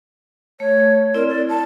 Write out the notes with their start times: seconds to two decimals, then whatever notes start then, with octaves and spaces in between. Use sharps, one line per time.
0.60 A3 C#5
1.14 C4 E4 A#4 D5
1.29 E4 D5
1.49 A5